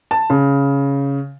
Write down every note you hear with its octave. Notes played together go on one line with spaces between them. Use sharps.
A5
C#3